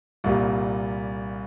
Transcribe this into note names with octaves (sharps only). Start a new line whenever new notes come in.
C2 A#2 G3